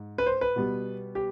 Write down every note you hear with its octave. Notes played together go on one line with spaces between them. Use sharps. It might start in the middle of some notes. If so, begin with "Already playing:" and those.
Already playing: G#2
B4
C5
B4
B2 G3 B3
G4